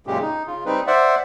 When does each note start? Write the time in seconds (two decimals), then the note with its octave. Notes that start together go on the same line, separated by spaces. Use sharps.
0.07 F#2 A#2 C#3 G#3 G4
0.22 D#4
0.47 C#3 F4
0.66 G3 C4 D#4 B4
0.87 C5 D5 E5 F#5